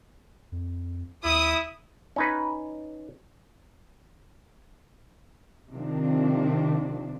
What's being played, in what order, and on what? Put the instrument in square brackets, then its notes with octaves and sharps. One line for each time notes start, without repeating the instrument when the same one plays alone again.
[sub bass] F2
[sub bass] D#2 [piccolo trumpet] E4 [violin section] D#6
[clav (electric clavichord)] C#4 D#4 B4
[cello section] C3 D#3 F3 C4 D4